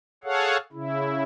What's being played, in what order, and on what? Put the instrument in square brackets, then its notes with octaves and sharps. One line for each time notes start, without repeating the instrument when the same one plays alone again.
[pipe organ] G#4 A4 C#5 F5 F#5
C#3 E4